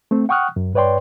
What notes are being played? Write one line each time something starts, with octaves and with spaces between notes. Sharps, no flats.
A3 C4
F#5 G5 C#6 D#6 F6 F#6
F#2
G2 B4 C#5 D5 G5 C6